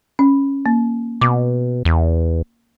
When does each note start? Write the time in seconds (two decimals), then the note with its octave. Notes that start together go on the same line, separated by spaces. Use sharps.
0.19 C#4
0.66 A#3
1.21 B2 D6
1.85 E2